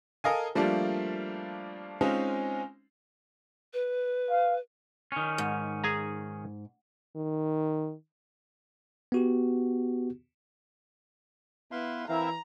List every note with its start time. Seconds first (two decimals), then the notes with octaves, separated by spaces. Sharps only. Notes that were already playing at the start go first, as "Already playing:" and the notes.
0.24 A4 A#4 D#5 F5 G#5
0.55 F3 G3 A3 A#3 D4 F4
2.01 G#3 C4 C#4 D#4 F4
3.74 B4
4.30 F5
5.12 D#3 C#4
5.38 G#2
5.84 G#4 G#5 A#5
7.16 D#3
9.12 B3 F#4 G4
11.72 B3 E4 B4 F5 C6
12.09 E3 C4 E4 A#4 E5 F5 A#5